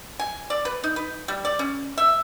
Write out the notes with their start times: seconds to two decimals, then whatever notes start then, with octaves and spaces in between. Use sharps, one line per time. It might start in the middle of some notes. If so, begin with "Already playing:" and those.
0.20 G#5
0.50 D5
0.65 B4
0.84 D#4
0.96 B4
1.28 G3
1.45 D5
1.59 C#4
1.98 E5